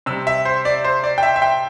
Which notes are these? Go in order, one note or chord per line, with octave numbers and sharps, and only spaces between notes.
C3 G3 E6
E5
C5
D5
C5
D5
G5
E5
E5
G5